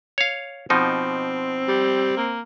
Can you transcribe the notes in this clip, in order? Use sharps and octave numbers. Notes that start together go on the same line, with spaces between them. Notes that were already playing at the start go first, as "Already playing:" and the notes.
C#5 F5
B2 F3 C4 D#4
G3
A#3